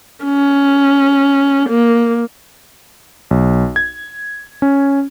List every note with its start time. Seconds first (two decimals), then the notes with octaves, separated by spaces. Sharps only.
0.24 C#4
1.70 A#3
3.31 B1
3.76 G#6
4.62 C#4